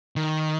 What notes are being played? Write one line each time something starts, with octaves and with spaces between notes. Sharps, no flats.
D#3